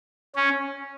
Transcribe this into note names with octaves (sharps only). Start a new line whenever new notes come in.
C#4